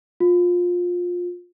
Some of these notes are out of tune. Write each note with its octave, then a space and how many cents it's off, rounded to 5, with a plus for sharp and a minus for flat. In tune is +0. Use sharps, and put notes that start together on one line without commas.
F4 +20